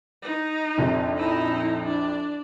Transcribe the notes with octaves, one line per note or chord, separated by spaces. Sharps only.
D#4
A#1 F2
D#4 E4
D4